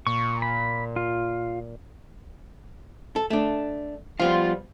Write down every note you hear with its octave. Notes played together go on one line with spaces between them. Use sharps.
A#2 C#6
B5
F4
A4
A3 D4
F3 G3 B3 F4 F5